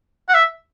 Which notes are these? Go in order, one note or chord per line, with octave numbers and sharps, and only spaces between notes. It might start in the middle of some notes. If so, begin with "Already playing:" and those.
F#5
E5